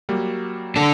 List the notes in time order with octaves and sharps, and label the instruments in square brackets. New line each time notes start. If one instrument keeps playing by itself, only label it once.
[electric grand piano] F#3 G3 A#3
[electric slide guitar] D4 A4